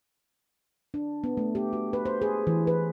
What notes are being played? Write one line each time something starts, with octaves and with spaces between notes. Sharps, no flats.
D4
B3
A3
G4
F#4
B4
C5
G#4
E3
B4